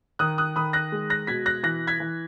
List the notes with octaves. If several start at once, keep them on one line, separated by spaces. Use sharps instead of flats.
D#3 D#6 F#6
D#6 F#6
D#3 B5 D#6
F#6 A#6
G#3
F#6 A#6
B2 G#6 B6
F#6 A#6
E3 F#6 A#6
G#6 B6
E3